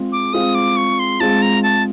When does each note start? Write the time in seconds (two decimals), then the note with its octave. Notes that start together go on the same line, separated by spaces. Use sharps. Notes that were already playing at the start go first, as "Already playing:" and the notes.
Already playing: G#3 C4 F4
0.12 D6
0.33 G#3 C4 F4 D#6
0.55 D6
0.77 C#6
0.99 C6
1.20 G#3 C4 F4 A5
1.42 A#5
1.63 A5